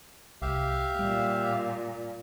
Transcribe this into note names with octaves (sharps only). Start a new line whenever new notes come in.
C2 G4 E5 F5
A#2 G3